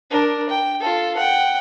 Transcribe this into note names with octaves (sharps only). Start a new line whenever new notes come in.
D4 A#4
G5
F4 A4
F#5 G5